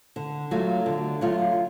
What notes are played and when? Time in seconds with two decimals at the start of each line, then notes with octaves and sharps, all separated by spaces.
0.16 D3
0.51 F#3 A3 F4
0.86 D3
1.21 F#3 A3 F4